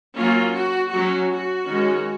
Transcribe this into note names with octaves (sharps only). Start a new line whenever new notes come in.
F#3 A#3 C#4 F4
F#4
F#3 C#4 F#4
F#4
D#3 G#3 C#4